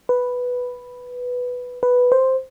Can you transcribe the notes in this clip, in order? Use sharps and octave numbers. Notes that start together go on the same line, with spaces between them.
B4
B4
C5